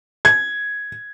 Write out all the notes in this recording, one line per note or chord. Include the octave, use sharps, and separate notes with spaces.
G#6